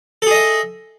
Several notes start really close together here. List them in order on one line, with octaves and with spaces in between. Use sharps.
A4 G#4 D#5 E5